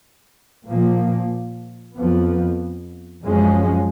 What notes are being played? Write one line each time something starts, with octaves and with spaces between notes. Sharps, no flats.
A#2 F3 A#3
F2 F3 B3
F#2 F3 G#3 C#4